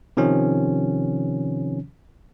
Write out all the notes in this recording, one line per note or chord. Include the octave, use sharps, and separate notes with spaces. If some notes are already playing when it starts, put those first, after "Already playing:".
C3 D#3 F3 C#4